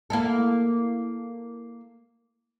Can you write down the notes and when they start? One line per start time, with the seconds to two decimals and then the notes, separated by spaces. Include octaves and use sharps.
0.10 A#3 E4 A4